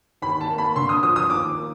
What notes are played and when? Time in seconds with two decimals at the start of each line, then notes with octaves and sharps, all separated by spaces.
0.22 D#2 B5
0.41 A5
0.49 A#3
0.58 B5
0.76 D3 C6
0.89 D#6
1.03 F3 D#6
1.16 D#6
1.30 D#2 D6
1.57 A#3